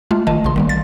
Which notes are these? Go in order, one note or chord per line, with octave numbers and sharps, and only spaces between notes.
G#3 A3 F4
G1 D#3 D#5 A5
A#1 C#3 C6
D#3 G3 A#3
A6